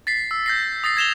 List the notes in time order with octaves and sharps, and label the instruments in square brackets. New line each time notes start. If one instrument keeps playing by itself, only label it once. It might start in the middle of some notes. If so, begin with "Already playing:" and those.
[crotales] A6 B6 C7
E6
G6 A#6 C7
D#6 A6 A#6 C7
G#6 A#6 E7 F7 G7